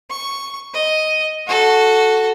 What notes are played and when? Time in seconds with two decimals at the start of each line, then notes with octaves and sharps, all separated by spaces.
0.11 C#6
0.74 D#5
1.47 F#4 A4